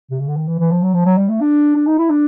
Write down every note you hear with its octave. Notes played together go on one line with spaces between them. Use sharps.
C3
C#3
D3
D#3
E3
E3
F3
F#3
F3
F#3
G3
A3
D4
D4
D#4
E4
D4